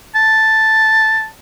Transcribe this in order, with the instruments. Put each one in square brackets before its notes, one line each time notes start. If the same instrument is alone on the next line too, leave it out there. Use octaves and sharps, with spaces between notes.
[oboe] A5